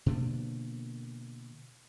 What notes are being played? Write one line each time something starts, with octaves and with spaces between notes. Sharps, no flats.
B2 D3 F3 A#3